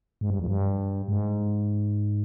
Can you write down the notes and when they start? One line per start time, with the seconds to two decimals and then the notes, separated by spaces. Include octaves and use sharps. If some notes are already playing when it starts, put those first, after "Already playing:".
0.21 G#2
0.30 G2
0.40 F2
0.47 G2
1.08 G#2